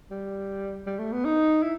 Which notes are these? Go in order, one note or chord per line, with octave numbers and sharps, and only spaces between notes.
G3
G3
A3
B3
D#4
E4